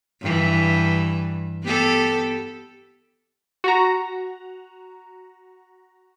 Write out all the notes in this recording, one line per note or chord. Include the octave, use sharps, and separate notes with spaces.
G2 E3
B3 G4 A4
F#4 A#5